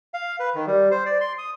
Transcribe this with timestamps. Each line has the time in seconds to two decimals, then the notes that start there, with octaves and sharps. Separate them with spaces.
0.14 F5
0.40 B4
0.55 D#3
0.67 G3
0.91 C5
1.06 D5
1.21 C6
1.38 D#6